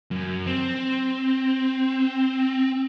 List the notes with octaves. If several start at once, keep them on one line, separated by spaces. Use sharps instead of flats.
F#2
C4